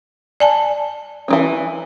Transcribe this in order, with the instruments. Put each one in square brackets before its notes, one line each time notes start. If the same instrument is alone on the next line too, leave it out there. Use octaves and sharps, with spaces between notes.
[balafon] D5 G#5 A5
[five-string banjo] E3 F#3 C#4